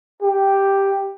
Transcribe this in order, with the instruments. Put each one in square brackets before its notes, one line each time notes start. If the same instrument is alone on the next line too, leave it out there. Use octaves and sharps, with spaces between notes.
[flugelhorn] G4